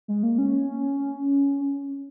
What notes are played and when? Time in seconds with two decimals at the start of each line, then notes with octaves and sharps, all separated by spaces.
0.08 G#3
0.23 A#3
0.38 C#4